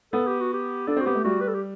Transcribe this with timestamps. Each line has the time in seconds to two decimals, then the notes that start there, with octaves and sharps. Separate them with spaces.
0.13 B3 A4
0.27 G4
0.40 F#4
0.53 G4
0.87 D4 A4
0.96 C4 F#4
1.06 B3 G4
1.15 A3
1.24 G3 F#4
1.41 B4
1.48 A4
1.54 G4